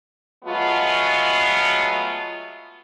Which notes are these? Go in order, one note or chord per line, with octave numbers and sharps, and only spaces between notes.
F#3 G#3 A3 B3 F4